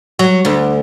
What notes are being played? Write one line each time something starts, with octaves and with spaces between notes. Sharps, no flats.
F#3
D2